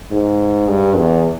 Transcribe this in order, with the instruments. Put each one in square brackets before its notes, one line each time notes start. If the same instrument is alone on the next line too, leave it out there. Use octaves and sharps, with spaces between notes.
[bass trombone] G#2
G2
E2